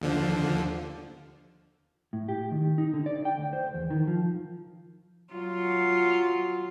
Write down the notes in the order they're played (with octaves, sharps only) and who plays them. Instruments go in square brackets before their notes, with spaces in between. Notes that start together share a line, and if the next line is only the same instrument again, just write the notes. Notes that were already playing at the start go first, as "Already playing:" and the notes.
[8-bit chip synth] D#2 D3 F3
[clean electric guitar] A2
G4
D#3
D#4
D3
D5
G5
D2
C5
E2
D#3
F3
[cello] F#3 F4